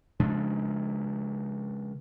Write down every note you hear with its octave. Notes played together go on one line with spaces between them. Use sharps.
C#3 F3 G#3 D4